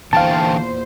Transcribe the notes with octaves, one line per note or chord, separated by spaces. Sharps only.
E2 A#2 D3 E3 C5 F5 G5 A5